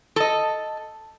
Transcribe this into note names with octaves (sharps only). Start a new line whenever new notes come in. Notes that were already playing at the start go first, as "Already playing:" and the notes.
A4 D#5